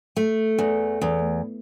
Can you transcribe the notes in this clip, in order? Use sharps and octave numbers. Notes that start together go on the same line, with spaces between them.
A3
E2
E2